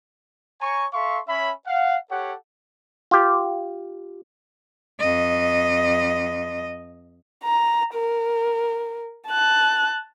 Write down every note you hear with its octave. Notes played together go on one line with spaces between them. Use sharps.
C#5 G#5 A#5 C#6
A4 E5 F5 C6 C#6
C#4 C#5 E5 B5
F5 F#5
G4 A4 C#5 F#5
F4 G4
F2 D#5
A#5
A#4
A5 F#6